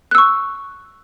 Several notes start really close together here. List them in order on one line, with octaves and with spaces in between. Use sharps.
F#6 E6 C#6